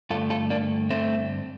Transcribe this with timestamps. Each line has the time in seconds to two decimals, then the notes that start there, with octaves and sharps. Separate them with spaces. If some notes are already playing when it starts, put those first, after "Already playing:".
0.10 G2 D3 A3 F4 A4
0.30 F4 A4
0.50 A#3 D4
0.90 A3 C4